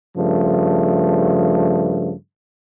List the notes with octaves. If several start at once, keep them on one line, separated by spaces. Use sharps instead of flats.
G2 C#3 F3 A3